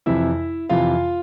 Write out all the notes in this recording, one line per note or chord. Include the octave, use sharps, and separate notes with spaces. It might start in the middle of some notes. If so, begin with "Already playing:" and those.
F2 C3 E3 E4 E5
F2 C3 E3 F4 F5